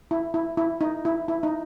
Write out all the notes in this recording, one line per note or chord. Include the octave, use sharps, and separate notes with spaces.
E4
E4
E4
D#4
E4
E4
D#4